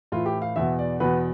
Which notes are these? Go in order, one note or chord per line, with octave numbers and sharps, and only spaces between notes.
A2 E3 F4
G4
F5
E2 B2 E5
D5
E2 B2 B4